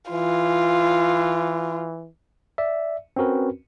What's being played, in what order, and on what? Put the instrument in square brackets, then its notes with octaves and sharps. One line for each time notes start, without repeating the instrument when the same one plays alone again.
[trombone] E3 [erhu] F4
[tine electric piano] D5 E5
C4 C#4 F#4 A#4 B4